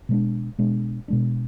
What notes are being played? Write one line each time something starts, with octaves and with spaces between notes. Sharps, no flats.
B2 G#3 D4
B2 G#3 D4
B2 G#3 D4